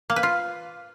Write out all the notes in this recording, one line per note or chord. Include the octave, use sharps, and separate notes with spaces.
A#3
B4
F4